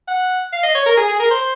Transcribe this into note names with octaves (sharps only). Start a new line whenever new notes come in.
F#5
F5
D#5
C#5
A#4
G#4
G#4
A#4
C5